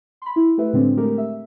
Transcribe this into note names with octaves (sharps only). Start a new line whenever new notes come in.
B5 C6
E4
A3 G4 B4 E5
A2 D3 G#3 C4 D4
G#3 A3 G4 A#4
E5